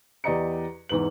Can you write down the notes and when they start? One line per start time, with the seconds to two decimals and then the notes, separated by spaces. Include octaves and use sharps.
0.24 E2 G4 D5 D#5 A#5 C#7
0.89 E2 G#2 B4 F#7